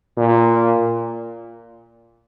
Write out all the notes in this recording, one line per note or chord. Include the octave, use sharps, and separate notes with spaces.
A#2